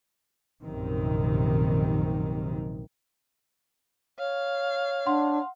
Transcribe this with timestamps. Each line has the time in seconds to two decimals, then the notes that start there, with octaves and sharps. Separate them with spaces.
0.62 A#1 F#2 C3 D#3
4.19 C#5 F5
5.06 D4 F#5 C6